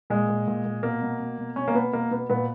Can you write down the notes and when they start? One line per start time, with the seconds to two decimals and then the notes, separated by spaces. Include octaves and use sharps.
0.10 A#2 G#3
0.29 A#2
0.47 A#2
0.65 A#2
0.83 B2 A#3
1.02 B2
1.20 B2
1.38 B2
1.56 B2 C#4
1.68 A#3
1.75 B2 B3
1.93 B2 A#3
2.11 B2 B3
2.29 A#2 B3